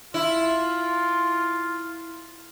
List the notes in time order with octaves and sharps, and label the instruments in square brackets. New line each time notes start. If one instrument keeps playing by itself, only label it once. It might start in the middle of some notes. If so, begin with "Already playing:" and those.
[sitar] E4 [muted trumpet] F4